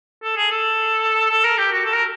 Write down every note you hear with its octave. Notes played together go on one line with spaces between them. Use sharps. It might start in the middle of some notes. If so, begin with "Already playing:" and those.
A4
G#4
A4
A4
A#4
G4
F#4
A4
A#4